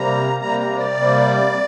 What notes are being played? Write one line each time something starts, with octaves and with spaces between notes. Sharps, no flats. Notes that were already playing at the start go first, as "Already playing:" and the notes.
Already playing: C3 G3 A#3 A#5
C3 G3 A#3 A#5
A#5
D5
C3 G3 A#3